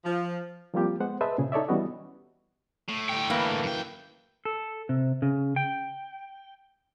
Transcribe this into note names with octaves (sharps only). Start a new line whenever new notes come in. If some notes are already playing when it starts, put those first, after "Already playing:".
F3
F3 G3 A#3 C4 F4 G4
G#3 B3 C5 F#5
G#4 B4 C5 D#5 E5 A5
A#2 C#3 G#4
D#4 A4 C#5 D5 E5
E3 G3 B3 C#4 F#4 D#5
A2
D3 G5
E3 A#3
F#2 G5
A4
C3
C#3
G5